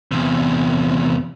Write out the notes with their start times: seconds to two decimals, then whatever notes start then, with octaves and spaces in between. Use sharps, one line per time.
0.12 E2 C3